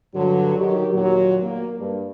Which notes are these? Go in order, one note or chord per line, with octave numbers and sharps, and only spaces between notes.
G2 D3 F#3
D#3 F#3 G4
D#2 A#2 F#3
A#3
G2